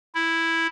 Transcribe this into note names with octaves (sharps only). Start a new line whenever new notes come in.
E4